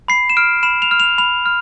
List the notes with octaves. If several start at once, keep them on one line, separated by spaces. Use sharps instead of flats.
B5 C7
E7
F6 D7
B5 E7
F7
F6
F7
B5 F7
F6